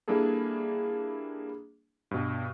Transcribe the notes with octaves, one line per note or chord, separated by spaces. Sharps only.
G3 A#3 D4 E4 G#4 A4
G2 B2